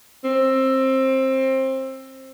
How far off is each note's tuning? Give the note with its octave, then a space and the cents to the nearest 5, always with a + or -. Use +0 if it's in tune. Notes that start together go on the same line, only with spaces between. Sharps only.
C4 +20